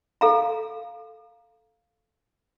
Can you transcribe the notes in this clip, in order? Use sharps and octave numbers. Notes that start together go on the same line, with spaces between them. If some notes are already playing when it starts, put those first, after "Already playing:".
A4 F5 A#5